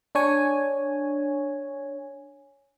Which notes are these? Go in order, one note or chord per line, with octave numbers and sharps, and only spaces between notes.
D4 C#5 G#5